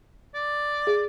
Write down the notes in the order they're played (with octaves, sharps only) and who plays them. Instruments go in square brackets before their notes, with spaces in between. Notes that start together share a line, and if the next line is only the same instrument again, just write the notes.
[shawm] D5
[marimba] G#4